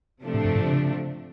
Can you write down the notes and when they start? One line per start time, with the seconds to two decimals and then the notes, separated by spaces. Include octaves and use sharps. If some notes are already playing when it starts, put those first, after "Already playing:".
0.24 C3 F3 A3 D4
0.34 A2
0.45 G2
0.55 G#2
0.66 C#3